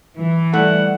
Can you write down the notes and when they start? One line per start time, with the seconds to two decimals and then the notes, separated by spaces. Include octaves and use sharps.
0.17 E3
0.54 G3 A3 E4 F#5